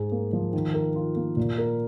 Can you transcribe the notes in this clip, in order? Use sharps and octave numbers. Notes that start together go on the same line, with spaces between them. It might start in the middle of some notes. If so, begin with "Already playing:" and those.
Already playing: G#2 G#4
A#3
F3
D#3
A#4
F4
A#3
A#2
A#4